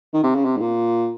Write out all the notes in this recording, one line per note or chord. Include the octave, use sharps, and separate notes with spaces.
D#3
C3
C#3
C3
G#2
A#2